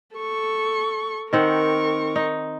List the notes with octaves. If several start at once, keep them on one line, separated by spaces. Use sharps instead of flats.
A4 C#6
D#3 C4 A#4 F#5 C#6
D#4